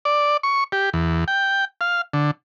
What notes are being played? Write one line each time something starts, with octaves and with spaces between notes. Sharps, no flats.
D5
C#6
G4
E2
G5
F5
D3